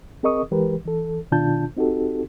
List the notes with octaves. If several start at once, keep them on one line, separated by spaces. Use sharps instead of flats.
C4 G#4 A#4 D#5 C#6 D#6
E3 G#3 G4 A#4 B4
E3 A4
B2 D#3 D4 F4 A5 G6
C4 D#4 F#4 G4 A4